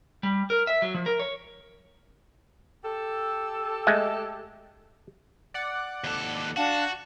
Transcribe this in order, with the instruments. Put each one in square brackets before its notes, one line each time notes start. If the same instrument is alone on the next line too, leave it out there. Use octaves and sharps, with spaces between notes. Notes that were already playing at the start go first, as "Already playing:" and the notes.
[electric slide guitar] G3
A#4
E5
F#3
F3
A#4
C#5
[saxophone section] G4 A4
[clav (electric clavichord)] G#3 A3 D#5
[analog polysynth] D5 F#5
[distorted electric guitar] D#2 A4
[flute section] D4 F5 A5 [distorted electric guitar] F#4 [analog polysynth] F#5